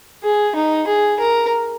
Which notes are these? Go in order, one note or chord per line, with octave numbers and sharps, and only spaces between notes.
G#4
D#4
G#4
A#4